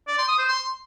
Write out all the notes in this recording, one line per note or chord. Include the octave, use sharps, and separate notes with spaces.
D5
C6
D#6
C5
C6